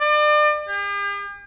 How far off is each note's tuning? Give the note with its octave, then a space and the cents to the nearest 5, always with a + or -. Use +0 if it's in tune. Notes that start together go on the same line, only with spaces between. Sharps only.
D5 +35
G4 +45